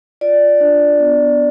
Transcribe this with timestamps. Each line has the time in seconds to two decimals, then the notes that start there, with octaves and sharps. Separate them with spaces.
0.21 F4 D5
0.60 D4
0.99 B3